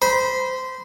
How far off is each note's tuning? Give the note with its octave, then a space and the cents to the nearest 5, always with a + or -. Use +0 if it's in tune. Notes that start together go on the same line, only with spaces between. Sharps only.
C5 -20 B5 -25